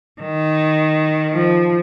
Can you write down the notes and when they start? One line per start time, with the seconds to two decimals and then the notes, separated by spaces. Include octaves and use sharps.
0.21 D#3
1.33 F3